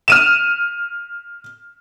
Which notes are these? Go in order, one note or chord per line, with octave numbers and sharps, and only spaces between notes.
F6 D#7 E7